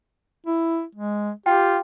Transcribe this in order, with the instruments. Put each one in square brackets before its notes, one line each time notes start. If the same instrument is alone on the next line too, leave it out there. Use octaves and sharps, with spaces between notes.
[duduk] E4
G#3
[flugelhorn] F4 [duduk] G4 [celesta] G5